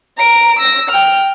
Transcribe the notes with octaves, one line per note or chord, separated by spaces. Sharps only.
A#5 D7
E6 A#6
G5 F6